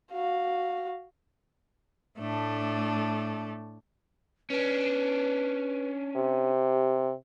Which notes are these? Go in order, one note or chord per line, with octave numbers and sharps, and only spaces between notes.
F#4 F5
A2 A3 D4
C#4 D4 B4
C3 G4